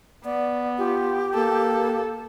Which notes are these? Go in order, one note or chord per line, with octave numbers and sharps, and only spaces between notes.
B3 D5
F4 G4
A#3 A4